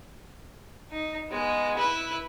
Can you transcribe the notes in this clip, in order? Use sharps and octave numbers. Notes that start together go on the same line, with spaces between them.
D#4
G#3 B3
E4 B4